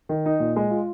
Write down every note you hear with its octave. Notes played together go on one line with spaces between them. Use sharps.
D#3
D#4
A#2
G#3
F4